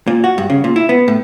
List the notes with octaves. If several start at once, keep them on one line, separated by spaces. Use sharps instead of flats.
A#2
F#4
G2
C#3
A#2
E4
B3
A2